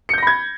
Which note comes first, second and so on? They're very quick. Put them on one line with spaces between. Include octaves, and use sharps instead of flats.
C#7 G6 A#6 B5 G#6